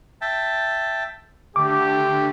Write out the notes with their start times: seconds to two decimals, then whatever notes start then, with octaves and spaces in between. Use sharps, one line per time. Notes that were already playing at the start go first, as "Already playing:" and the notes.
0.21 E5 G5 A5
1.56 D3 A3 G4 D6